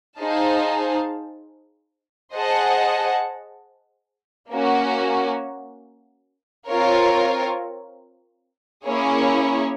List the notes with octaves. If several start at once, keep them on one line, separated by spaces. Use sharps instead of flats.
D#4 G#4 C5 F5 A5
G#4 C5 D#5 F#5 A5
A#3 C#4 F#4
C4 F4 A#4 C#5
A#3 C#4 E4 G#4 C#5